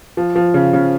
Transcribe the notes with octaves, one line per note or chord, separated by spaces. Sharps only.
F3
F3
C#3
C#3